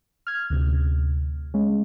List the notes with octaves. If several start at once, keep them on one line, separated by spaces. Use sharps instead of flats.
F6 G#6
D2 C3
G#3 C#4